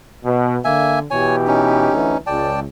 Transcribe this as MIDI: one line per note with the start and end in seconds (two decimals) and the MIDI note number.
0.24 0.57 47
0.65 1.03 50
0.65 0.99 58
0.65 0.99 76
0.65 0.99 80
1.11 1.90 47
1.11 1.90 52
1.11 1.90 67
1.11 1.36 73
1.11 1.36 80
1.47 2.18 61
1.47 2.18 63
1.92 2.13 38
1.92 2.13 50
1.92 2.13 52
2.27 2.63 37
2.27 2.60 74
2.27 2.60 79
2.27 2.60 81